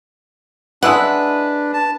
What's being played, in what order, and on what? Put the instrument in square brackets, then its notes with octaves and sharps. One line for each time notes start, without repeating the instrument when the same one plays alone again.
[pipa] G#3 E4 F#5 [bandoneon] D4 [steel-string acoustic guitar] B4
[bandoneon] A5